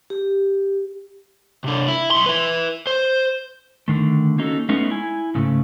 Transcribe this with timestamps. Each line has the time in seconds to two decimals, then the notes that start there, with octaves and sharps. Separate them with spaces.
0.10 G4
1.64 C3 D4
1.88 E4
2.11 B1 C6
2.26 B4 E5
2.87 C5
3.88 D3 D#3 A3
4.38 A#3 C#4 D#4 F#4 G#4 A4
4.69 G#3 A3 B3 C#4 D#4
4.90 E4 G#5
5.35 G#2 C#3 A3